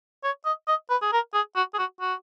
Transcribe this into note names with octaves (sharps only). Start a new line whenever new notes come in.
C#5
D#5
D#5
B4
G#4
A#4
G#4
F#4
G#4
F#4
F#4